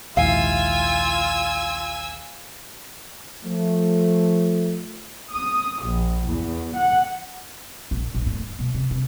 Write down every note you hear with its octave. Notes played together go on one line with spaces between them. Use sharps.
A#1 D#2 G#2 E4 F4 F5 G#5 E6
F3 A3
D#6
A#1
E2
F#5
A#1
A#1
A2
E2
B2
C3
C3